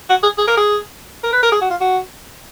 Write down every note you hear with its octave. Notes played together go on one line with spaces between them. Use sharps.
F#4
G#4
G#4
A#4
G#4
A#4
B4
A#4
G#4
F#4
F4
F#4